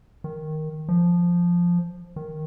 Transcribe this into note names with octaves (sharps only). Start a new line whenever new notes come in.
D#3
F3
D#3